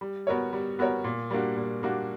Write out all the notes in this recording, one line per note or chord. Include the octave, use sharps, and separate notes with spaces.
G3
B3 F#4 A#4 C#5
G3
B3 F#4 A#4 C#5
A#2
G3 A#3 D4 F#4
A#2
G3 A#3 D4 F#4